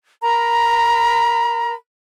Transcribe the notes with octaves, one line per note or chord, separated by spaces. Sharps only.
A#4 A#5 B5